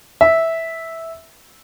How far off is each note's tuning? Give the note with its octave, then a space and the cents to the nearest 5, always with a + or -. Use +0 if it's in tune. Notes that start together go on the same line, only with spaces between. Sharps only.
E5 -10